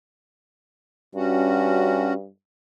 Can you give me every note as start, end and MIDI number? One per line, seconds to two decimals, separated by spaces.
1.15 2.28 43
1.15 2.14 61
1.15 2.14 66